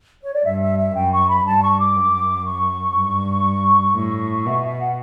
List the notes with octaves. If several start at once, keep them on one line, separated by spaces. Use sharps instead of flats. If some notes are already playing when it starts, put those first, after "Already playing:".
C#5
D5
G2 E5
E5
E5
F#2 G5
C#6
B5
G2 A5
C#6
D6
F#2
C#6
G2
A2
B2 E5
E5
F#5